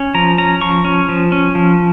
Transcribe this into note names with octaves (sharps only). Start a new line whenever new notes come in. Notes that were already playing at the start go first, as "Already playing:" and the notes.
Already playing: C#4
F3 A#5
C#4 A#5
F3 C#6
C#4
F3
C#4
F3